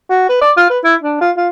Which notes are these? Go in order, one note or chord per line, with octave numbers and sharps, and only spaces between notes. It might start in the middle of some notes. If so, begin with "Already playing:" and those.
F#4
B4
D5
F4
B4
E4
D4
F4
F4